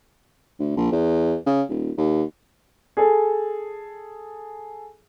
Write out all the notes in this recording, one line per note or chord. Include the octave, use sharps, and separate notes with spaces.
D2
A#1
E2
C#3
D#1
D#2
G#4 A4